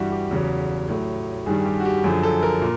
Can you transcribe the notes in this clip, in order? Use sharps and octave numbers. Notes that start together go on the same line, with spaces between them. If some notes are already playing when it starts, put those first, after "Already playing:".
Already playing: G2 E3 G3 F#4 G4
G4
E2 C#3 F#3
A2 F#3
G2 D#3 G3 G#4
G4
F#4
G4
F#2 D3 F3 G#4
A4
A#4
A#2